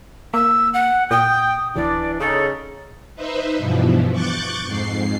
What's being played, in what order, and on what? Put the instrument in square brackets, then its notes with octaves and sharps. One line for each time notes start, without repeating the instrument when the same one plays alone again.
[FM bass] A#3 [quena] E6
[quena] F#5
[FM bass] A#2 [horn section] G5 [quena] D#6
[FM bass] D1 [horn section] E3 D4 [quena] D5
[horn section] C#3 D#4 [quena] A4
[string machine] D#4 B4 C5 E5
G2 B2 E3 F3
C#6 D6 F#6 G6 A6
F2 G#2 C7